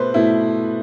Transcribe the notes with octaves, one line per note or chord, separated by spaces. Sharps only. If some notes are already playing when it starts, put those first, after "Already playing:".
Already playing: B2 A3 B4 C5
B2 A3 E4